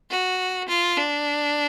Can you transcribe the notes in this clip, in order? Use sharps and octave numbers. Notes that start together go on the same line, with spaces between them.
F#4
F4
D4